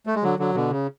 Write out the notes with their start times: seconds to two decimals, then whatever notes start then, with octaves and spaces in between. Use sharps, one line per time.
0.06 A3
0.15 G#3
0.23 D3 F#3
0.39 D3 F#3
0.54 B2 D3
0.71 C#3